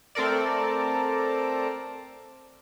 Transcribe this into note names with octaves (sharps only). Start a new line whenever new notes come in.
A3 C4 A4 A#4 D5